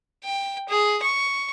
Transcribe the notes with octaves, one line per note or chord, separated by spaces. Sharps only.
G5
G#4
C#6